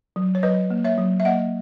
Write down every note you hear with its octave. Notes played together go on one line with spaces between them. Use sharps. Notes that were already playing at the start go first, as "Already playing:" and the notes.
F#3
C#5
F#3 B4 D#5
A#3
C#5 E5
F#3
E5
A#3 D#5 F#5